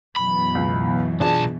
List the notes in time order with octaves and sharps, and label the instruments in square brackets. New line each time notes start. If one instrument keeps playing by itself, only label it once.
[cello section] F#2 B2 E3 [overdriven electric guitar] B5
[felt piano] C#2
[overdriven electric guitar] B1 A5 [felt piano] D4 F4 G#4